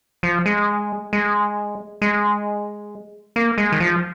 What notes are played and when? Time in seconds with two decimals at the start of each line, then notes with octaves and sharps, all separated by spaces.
0.23 F3
0.46 G#3
1.13 G#3
2.02 G#3
3.36 A#3
3.58 G#3
3.72 D#3
3.80 F3